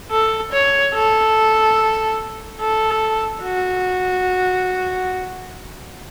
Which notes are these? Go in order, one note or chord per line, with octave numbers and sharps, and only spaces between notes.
A4
C#5
A4
A4
F#4